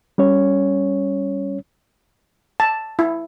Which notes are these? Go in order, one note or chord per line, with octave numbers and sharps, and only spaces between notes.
G3 C#4 C#5
A5
E4